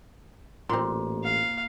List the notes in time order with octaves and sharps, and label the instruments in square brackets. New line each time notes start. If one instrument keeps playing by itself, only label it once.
[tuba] A1 [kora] A#2 [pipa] C4 C6
[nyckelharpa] F5